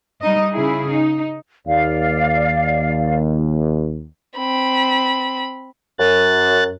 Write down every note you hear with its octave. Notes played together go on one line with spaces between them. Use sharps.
G3 D#4 D#5
C#3 E4 G#4
D#4
D#2 D5 F5
C4 B5
F#2 F#6 A6